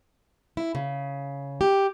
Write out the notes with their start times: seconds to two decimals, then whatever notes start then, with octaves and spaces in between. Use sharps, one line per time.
0.57 E4
0.75 C#3
1.61 G4